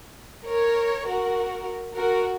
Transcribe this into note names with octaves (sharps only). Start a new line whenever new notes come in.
A#4 C#5
F#4 A#4
F#4 A#4